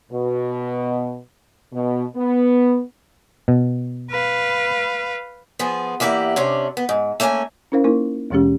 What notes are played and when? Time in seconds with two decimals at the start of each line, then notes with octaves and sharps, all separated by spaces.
0.12 B2
1.72 B2
2.16 B3
3.48 B2
4.10 B4 F5
5.59 F3 B3 G#4
6.00 E2 A#3 E4 G4 F#5
6.36 C3 C#4 D4
6.77 B3
6.89 G#2
7.20 A3 A#3 C#4 E5 G#5
7.72 C#4 E4 A#4 C5 F5
7.84 A#3 D#4 E4 A#4
8.30 D#2 B2 E3 G#3 C#4 G4